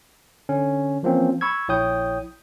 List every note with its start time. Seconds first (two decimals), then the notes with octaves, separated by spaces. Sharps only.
0.49 D3 C#4
1.03 E3 F3 A#3 C4 C#4
1.41 B5 C#6 E6 G#6
1.68 A#1 E4 C#5 G5 D#6 G6